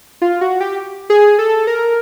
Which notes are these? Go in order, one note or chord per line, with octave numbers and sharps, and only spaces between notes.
F4
F#4
G4
G#4
A4
A#4